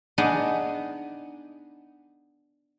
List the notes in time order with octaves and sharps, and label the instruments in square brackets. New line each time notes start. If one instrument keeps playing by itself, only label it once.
[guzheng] B3 D4 D#4 G#4 G#5